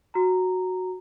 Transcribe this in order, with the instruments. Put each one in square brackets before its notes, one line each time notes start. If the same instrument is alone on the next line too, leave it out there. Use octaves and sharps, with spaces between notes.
[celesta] F#4 A#5